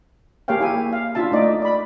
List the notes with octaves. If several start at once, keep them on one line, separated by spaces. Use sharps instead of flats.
A#3 G4 G#4 C#5 F5 G5
E4 G4 E5 G#5
F5
D4 E4 F4 E5 A5
A3 D#4 D5 D#5
D5 B5